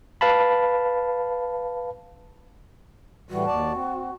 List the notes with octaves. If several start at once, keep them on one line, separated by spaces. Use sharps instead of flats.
B4 F5 A5 B5
A2 E3 G3 F#4
D#2 D5 A5
C4